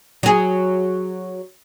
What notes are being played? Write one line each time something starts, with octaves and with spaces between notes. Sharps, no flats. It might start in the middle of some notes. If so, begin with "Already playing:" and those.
F#3 G#4